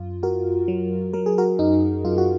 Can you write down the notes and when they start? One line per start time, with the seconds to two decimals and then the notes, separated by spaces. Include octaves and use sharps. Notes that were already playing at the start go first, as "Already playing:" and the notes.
Already playing: F#2 F4
0.23 F#2 F#4 A#4
0.68 F#3
1.13 F#3 A#4
1.26 G#4
1.38 F#4 A#4
1.59 F#2 D#4
2.05 F#2 F4
2.18 F#4